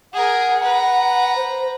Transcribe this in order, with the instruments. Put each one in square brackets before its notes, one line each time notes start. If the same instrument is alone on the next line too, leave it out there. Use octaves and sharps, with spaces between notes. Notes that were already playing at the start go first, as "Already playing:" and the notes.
[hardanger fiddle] G#4 A#4 [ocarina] F#5
[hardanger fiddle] B4 A#5
[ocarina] C5